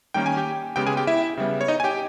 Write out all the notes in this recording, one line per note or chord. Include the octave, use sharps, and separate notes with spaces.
D#3 G3 A#3 C#4 G5
G#5
G4 G5
C#3 G#3 B3 G4 G5
G#4 G#5
G4 G5
E4 E5
C#3 G3 B3
C#5
D#4 D#5
G#5
G4 G5